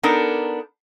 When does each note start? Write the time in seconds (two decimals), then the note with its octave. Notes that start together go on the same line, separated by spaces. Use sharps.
0.03 B3 D4 D#4 A4 A#4